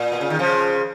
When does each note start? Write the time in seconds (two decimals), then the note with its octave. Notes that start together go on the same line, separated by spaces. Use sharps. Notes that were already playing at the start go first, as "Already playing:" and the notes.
Already playing: A#2
0.12 B2
0.21 C#3
0.30 D#3
0.39 C#3 F3